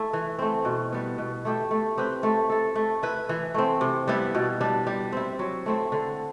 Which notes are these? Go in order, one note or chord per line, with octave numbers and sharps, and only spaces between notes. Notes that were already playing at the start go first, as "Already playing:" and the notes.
Already playing: A3 E4
E3
A3 C4
B2
G3 B3
B2
A3 E4 G4
A3
C4 G4 B4
A3
E4 A4
A3
E4 B4
E3
A3 C4
C3
G3 B3 E4
B2
G3 D4
G3
C4 E4
F#3
A3 C4 E4
D3